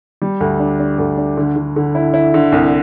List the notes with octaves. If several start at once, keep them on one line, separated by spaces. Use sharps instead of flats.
G3
D2
D4
D4
D2
D4
D3
D3
D3
E4
E4
D3
C2